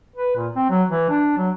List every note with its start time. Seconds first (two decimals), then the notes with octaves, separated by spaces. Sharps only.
0.16 B4
0.35 A#2
0.56 C4
0.70 F#3
0.90 E3
1.09 D4
1.38 F#3